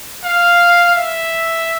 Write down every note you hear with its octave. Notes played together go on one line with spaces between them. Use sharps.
F5
E5